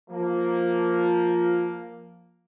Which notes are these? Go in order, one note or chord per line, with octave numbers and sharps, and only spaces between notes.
F3 A#3